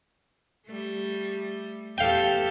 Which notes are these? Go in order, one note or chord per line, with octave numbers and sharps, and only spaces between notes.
G3 A3
E2 G4 A4 F5 G5